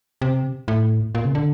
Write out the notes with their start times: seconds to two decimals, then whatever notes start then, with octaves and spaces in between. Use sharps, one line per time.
0.22 C3
0.68 A2
1.15 A#2
1.25 C#3
1.35 D3